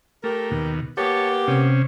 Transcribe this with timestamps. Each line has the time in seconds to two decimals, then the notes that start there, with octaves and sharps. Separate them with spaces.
0.24 A3 G4 A#4
0.51 D#2 B2
0.97 A#3 B3 G4 C#5 A5
1.48 C3 C#4